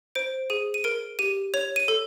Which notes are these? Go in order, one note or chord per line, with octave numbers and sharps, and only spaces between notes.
C5 D7
G#4 D#7
D#7
A#4 D7
G4 D#7
C#5 F7
D#7
A4